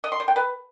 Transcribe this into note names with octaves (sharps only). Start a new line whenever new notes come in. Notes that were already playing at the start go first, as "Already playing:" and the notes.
D#5
C6
C5
G5
B4